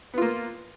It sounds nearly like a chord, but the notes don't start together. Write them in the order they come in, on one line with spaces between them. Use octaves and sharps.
B3 F4 A#3